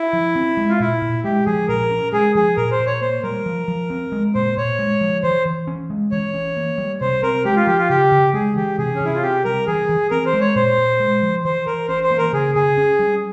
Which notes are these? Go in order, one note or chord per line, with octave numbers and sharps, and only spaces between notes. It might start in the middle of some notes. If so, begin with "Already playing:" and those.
Already playing: E4
F3
C4
G#3
F4
A#2 E4
A#2
G#3 G4
F3 G#4
A#2 A#4
C#4
G#3 G#4
F3 G#4
A#2 A#4
C5
A#2
C#5
A#3 C5
G3 A#4
F3
F3
C4
G#3
A#2 C5
A#2 C#5
G#3
F3
E3 C5
E3
C#4
G#3
E3 C#5
C#4
A#3
G3
C3 C5
C4 A#4
G#3 G4
F4
F3 G4
F4
C#3 G4
C#3
G#3 G#4
E3 G4
C3 G#4
C#4
C3 E4
F4
C4 G4
G3 A#4
E3 G#4
E3
C4 A#4
C5
G#3
C#5
A#2 C5
A#2
G#3
F3
E3 C5
E3 A#4
C#4 C5
C5
A#3
A#4
C#3 G#4
C#3 G#4
C#4
G3